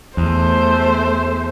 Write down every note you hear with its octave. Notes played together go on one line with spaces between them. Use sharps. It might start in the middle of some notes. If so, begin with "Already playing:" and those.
E2 A3 C5